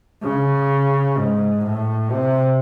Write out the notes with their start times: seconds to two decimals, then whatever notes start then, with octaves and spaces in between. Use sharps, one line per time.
0.23 C#3
1.18 G#2
1.65 A2
2.12 C3